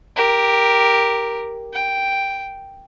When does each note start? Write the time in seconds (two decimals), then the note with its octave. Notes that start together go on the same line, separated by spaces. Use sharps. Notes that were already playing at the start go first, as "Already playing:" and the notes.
0.16 G4 A#4
1.74 G5